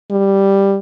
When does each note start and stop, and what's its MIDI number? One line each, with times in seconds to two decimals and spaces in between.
0.11 0.77 55